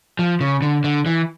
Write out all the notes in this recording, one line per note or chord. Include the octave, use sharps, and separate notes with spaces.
F3
C#3
D3
D3
E3